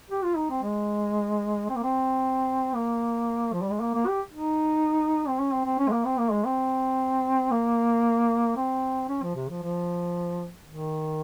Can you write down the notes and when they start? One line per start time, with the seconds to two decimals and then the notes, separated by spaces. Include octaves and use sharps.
0.11 G4
0.24 F4
0.36 D#4
0.50 C4
0.63 G#3
1.70 C4
1.76 A#3
1.83 C4
2.75 A#3
3.53 F3
3.62 G3
3.71 G#3
3.81 A#3
3.94 A#3
4.07 G4
4.33 D#4
5.28 C4
5.39 C#4
5.52 C4
5.65 C4
5.79 C#4
5.88 G#3
5.92 A#3
6.05 C4
6.18 A#3
6.32 G#3
6.45 C4
7.51 A#3
8.56 C4
9.09 C#4
9.23 F3
9.36 C3
9.49 F3
9.62 F3
10.68 D#3